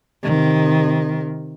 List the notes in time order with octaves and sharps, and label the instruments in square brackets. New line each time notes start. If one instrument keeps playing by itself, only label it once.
[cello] C3 D#3